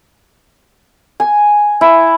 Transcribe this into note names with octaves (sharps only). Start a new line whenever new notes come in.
G#5
E4